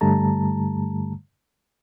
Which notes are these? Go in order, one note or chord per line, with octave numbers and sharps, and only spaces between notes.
G2 D3 G3 A3 A5 A#5